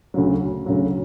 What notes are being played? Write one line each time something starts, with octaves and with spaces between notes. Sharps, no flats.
D2 C#3 F#3
D2 C#3 F#3